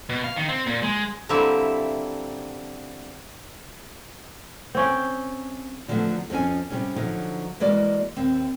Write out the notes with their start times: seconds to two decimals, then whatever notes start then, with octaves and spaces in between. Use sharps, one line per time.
0.09 B2
0.24 F5
0.36 D#3
0.49 C4
0.66 A#2
0.83 G#3
1.29 D3 G3 A#3 C4 E4 E5
4.75 C4 C#4 G5
5.88 D3 F3 F#3 G#3 A3 B3
6.30 F2 F3 C4 C#4 G#5
6.70 C3 G3 C#4
6.96 D3 F3 F#3 D#4
7.60 E3 G#3 A#3 F#4 D5
8.16 D#2 C4